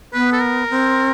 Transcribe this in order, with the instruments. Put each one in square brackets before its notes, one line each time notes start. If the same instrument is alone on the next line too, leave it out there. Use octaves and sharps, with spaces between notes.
[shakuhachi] B3 [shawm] B4
[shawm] A4
A#4
[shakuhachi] C4